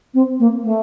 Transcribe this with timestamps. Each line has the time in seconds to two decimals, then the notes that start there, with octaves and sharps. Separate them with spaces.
0.14 C4
0.39 A#3
0.63 A3